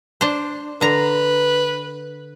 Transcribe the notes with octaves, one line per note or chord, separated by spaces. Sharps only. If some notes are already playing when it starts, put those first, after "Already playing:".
D4 C5
D3 B4 A#5